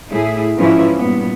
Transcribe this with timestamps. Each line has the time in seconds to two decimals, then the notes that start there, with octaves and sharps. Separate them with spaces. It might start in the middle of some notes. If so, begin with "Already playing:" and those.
0.10 A2 E4 G#4
0.57 G#2 E3 F3 C#4 E4
0.96 G2 A#2 B3